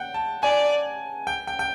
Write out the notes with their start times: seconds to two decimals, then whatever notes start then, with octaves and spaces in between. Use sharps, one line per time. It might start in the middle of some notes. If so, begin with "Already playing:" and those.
Already playing: F#5 G5
0.14 A5
0.43 D5 G#5
1.27 G5
1.47 G5
1.59 G5